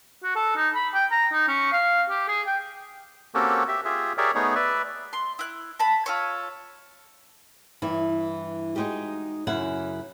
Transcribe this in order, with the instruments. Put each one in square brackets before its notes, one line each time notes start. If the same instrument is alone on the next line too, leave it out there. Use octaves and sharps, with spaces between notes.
[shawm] F#4
A4
D#4
B5
G5
A#5
D#4
C#4
F5
G4
G#4
G5
[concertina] A#3 C4 C#4 F#4 G4 A4
G4 E5
F4 G4 G#4 E5
G4 G#4 A#4 C#5 D5 E5
A3 B3 D#4 G#4 C#5
B4 D5 E5
[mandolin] C6
E4 F#6
A5 B5
F4 A4 C#5
[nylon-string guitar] G2 E3 E4
G#3 D#4 F#4 G4
F#2 C#3 E4 F#4 F#5